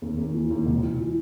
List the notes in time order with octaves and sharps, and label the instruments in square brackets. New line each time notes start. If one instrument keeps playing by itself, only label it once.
[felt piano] D#2
D#2
E3
D#2
E1
E3
E3